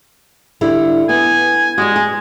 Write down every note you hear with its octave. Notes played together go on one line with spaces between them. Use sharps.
D3 G3 E4
B3 G#5
G3 G#3 F#4
G#5